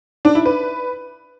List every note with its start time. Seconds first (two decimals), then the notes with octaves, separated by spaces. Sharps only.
0.25 D4
0.35 E4
0.46 B4